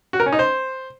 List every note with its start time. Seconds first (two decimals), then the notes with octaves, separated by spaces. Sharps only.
0.13 F#4
0.20 A#4
0.26 C#4
0.33 D#4
0.39 C5